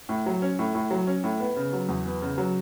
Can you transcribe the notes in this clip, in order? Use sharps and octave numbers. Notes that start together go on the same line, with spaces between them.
A2
F#3
C#4
A2
A2
F#3
C#4
A2
B3
C#3
F#3
E2
B3
C#3
F#3